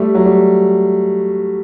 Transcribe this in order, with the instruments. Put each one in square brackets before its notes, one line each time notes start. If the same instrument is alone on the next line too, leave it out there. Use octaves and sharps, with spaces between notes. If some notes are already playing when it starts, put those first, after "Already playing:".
Already playing: [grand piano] G3 A3
F#3
G3